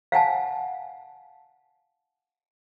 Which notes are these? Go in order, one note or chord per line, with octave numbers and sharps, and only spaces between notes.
F5 F#5 G#5 A5